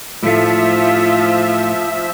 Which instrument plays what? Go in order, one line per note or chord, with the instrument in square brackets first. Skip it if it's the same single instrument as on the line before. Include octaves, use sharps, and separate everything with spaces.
[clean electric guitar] A2 A3 [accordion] F3 E5 [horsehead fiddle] F4